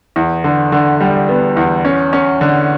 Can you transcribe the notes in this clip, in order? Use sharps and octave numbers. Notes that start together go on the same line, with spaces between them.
E2
D3
D3
G3
B3
E2
C#4
C#4
D3